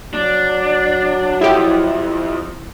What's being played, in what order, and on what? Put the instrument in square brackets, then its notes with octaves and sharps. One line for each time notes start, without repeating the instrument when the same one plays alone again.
[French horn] F#3 [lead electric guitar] D4
[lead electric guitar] F2 [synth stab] E4 G4